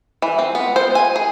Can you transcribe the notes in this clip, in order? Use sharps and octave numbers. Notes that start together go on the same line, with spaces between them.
E3
C4
B3
C5
G#5
G#4